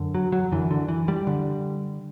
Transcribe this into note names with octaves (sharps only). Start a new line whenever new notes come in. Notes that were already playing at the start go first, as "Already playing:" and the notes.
Already playing: F#2 D3
F#3
F#3
F#2 D3 E3
D3
E3
G3
D3